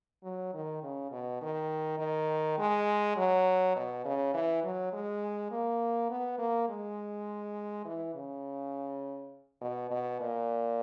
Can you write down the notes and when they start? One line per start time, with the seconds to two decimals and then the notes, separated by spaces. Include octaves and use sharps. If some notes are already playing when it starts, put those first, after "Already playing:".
0.23 F#3
0.54 D#3
0.83 C#3
1.12 B2
1.41 D#3
1.99 D#3
2.58 G#3
3.17 F#3
3.76 B2
4.05 C#3
4.34 E3
4.63 F#3
4.93 G#3
5.51 A#3
6.10 B3
6.39 A#3
6.69 G#3
7.85 E3
8.15 C#3
9.61 B2
9.91 B2
10.21 A#2